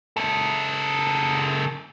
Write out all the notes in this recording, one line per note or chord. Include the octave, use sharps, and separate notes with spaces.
C#3 A4